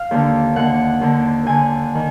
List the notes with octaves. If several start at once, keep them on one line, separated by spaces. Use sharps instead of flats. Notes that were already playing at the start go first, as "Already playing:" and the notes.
Already playing: F5
D#2 D3
D#2 D3 F#5
D#2 D3
D#2 D3 G#5
D#3